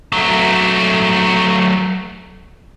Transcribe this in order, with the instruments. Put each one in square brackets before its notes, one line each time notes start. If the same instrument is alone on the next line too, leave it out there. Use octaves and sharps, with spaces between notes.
[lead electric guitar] F#3 A3